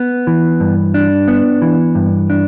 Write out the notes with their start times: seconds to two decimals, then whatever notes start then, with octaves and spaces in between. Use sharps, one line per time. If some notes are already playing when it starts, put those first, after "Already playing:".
Already playing: B3
0.27 E3
0.60 G2
0.94 D4
1.28 B3
1.62 E3
1.95 G2
2.30 D4